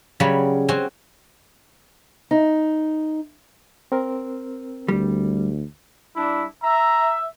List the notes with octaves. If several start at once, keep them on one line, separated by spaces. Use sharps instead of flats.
C#3 F#3 G3 C#5 B5
C4 C#4 F#4 G#5 C6
D#4
C4 A#4
D2 G3
G3 D4 E4
E5 A#5